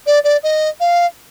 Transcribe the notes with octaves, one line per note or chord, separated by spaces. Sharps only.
D5
D5
D#5
F5